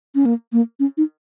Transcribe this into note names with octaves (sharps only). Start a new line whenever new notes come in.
C#4
A#3
A#3
C#4
D#4